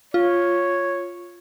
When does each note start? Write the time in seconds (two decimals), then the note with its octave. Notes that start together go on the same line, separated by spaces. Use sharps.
0.14 F4 C#5